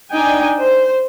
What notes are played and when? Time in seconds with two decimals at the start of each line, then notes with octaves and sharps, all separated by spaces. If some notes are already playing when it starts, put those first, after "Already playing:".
0.12 D4 D#4 G5 G#5
0.58 C5